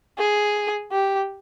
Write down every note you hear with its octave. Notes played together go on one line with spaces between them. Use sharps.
G#4
G4